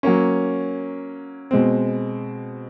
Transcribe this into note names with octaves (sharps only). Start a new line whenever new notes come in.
F#3 A#3 C#4
B2 G#3 C4